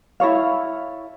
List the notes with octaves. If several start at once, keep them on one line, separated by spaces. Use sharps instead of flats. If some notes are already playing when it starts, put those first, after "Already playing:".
E4 A4 C#5 F5